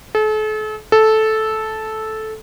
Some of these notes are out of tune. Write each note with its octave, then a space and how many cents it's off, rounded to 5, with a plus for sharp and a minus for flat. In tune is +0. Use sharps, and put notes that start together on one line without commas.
A4 -40
A4 -10